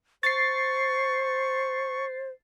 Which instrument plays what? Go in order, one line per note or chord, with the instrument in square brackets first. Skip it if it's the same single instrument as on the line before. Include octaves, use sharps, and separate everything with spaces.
[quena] C5 [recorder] C#6 [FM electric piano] A6 C7